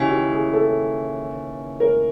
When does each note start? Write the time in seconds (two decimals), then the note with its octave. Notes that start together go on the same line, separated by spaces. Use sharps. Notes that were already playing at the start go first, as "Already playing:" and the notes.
Already playing: D#2 C#3 E3 G4
0.10 G4
0.32 G#4
0.53 A4
1.80 A#4